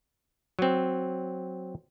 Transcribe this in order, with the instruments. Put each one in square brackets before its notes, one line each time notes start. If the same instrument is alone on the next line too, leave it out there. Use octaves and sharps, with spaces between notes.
[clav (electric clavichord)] F#3 C4